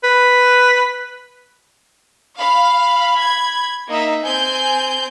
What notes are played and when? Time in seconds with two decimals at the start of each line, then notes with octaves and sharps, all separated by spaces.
0.03 B4
2.39 F5 B5
3.18 G#6
3.89 A#3 D#4 E5
4.24 C4 G#5 G6